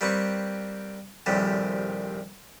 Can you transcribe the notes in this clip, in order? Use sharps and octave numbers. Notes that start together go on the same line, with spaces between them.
G3 A#3 C4 B4 C#6
A#1 D#2 A2 C3 G3